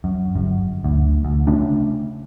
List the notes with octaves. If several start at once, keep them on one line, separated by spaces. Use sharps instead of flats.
F#2
G1 F#2
D2
D2
C#3 A3 C#4 D4